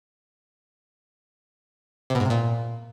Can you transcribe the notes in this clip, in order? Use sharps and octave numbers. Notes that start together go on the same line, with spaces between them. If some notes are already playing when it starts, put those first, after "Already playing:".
C3
B2
G#2
C3
A#2